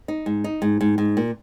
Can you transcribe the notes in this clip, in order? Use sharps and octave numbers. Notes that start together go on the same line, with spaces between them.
D#4
G#2
D#4
G#2
G#2
G#2
A#2